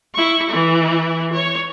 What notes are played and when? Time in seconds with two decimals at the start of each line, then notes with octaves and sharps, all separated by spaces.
0.14 E4 C#6
0.49 E3 E4
1.33 C#5